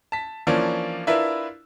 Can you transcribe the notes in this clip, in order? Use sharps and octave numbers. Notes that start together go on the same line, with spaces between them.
A5 B6
E3 F3 A#3 C#4 D4
D4 E4 F4 A#4 B4 E5